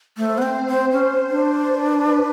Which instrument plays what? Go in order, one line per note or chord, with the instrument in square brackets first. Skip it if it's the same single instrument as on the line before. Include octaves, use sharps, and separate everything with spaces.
[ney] A3 [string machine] C5
[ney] B3
C4
C4
C#4
D4
[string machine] B4